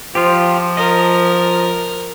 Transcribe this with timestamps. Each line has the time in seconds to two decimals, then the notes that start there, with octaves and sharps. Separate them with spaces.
0.15 F3 F4 G4
0.77 A#4 D#5